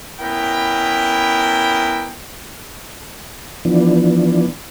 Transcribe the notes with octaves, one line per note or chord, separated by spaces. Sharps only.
B3 C#4 E4 A#4 G5
E3 F3 B3 D4